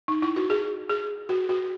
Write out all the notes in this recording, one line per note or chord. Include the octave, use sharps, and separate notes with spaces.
D#4
E4
F#4
G#4
G#4
F#4
F#4